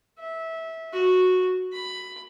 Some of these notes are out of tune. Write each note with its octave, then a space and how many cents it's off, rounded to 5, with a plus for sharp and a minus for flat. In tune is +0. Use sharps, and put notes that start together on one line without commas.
E5 -20
F#4 -10
B5 +10